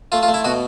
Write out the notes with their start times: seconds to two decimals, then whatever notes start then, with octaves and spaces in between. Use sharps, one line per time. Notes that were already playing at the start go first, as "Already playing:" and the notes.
0.12 A3 F4
0.23 F4
0.28 A3
0.34 E4
0.44 B2 F#4